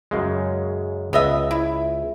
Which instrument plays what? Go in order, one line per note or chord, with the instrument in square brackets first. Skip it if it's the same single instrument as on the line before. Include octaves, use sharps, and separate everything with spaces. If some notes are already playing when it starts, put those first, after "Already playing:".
[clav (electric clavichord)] F#2 C#3 G#3
[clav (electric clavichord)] C#2 [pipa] B3 D#5 E5
[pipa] E4